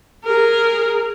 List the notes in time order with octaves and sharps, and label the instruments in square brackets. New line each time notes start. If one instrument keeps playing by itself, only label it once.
[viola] G#4 A#4